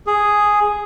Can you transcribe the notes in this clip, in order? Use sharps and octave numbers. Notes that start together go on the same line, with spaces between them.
G#4